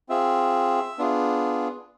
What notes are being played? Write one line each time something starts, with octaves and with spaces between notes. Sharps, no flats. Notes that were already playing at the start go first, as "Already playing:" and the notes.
C4 F4 G#4 E5
B3 D4 F4 G#4